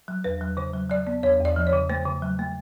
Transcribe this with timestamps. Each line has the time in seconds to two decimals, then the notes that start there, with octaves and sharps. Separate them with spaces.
0.08 F#3
0.24 E2 B4
0.41 F#3
0.57 C#3 C5
0.73 F#3
0.90 F#3 D5
1.07 B3
1.23 E2 C#5
1.40 E2
1.45 D5
1.56 F3
1.67 C#5
1.73 C#3
1.89 A3 C5
2.05 C#3
2.22 F#3
2.39 A3